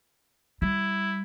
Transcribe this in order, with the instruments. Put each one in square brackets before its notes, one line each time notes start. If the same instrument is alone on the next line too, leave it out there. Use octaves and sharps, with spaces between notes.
[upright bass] G3 [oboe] E4